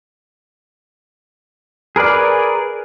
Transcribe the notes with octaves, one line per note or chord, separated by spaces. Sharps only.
G#4 A#4 B4 D5